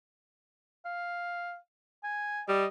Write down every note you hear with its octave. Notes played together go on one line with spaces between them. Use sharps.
F5
G#5
G3 D#5